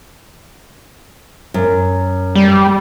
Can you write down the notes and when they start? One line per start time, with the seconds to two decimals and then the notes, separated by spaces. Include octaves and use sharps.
1.54 F#2
2.35 G3